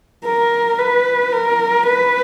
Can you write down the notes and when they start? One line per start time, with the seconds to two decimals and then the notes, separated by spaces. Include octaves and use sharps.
0.25 A#4
0.78 B4
1.32 A#4
1.86 B4